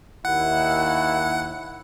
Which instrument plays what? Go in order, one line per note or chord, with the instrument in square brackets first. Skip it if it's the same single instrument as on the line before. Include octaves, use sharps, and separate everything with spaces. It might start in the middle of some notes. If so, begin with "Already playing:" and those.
[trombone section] D#2 E4 [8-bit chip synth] F#5